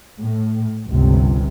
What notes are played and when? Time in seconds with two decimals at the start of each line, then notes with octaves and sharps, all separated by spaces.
0.19 A2
0.88 G1 C#2 C3